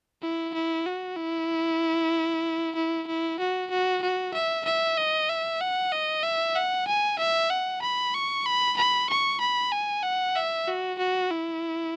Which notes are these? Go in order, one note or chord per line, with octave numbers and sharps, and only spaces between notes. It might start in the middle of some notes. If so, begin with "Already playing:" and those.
E4
E4
F#4
E4
E4
E4
F#4
F#4
F#4
E5
E5
D#5
E5
F#5
D#5
E5
F#5
G#5
E5
F#5
B5
C#6
B5
B5
C#6
B5
G#5
F#5
E5
F#4
F#4
E4